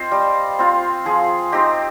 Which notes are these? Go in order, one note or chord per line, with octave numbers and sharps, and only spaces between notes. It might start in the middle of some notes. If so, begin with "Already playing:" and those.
Already playing: C4 F4 C5 D#5
G3
C4 F4
F3 G#4
C4 D#4 G4